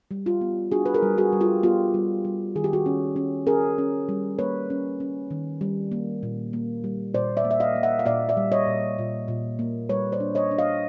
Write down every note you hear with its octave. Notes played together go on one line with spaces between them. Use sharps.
G3
F4 G4
B3
D4 F#4 G#4
B4
G#4 A#4
G3
F#4 G#4
G3
F4 G4
B3 F4 G4
G3
G3
D#3 G#4
G4
F#4 G#4
C#4
C#4
C#4 G#4 A#4
C#4
G3
A#3 B4 C#5
C#4
C#4
D#3
G3
A#3
A#2
A#3
G3
A#2 C5 D5
D5 E5
A#3
E5
D#5 F5
A#3
E5 F#5
F5
A#2 D5 E5
D5 E5
G3
C#5 D#5
A#2
A#2
A#2
A#3
G3 B4 C#5
C5 D5
D4
C#5 D#5
D4
D#5 F5